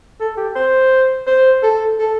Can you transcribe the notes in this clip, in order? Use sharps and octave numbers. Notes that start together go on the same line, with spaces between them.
A4
G4
C5
C5
A4
A4